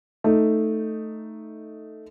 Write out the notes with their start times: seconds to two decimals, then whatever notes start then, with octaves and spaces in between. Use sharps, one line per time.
0.24 A3 D#4